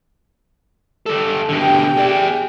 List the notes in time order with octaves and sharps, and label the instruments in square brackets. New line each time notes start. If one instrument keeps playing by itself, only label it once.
[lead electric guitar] G3 A4
[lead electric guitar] B2 D3 [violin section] G4 G5
[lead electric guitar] G#4 D5